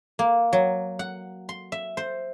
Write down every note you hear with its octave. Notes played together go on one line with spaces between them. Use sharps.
A#3
F#3
F#5
C6
E5
C5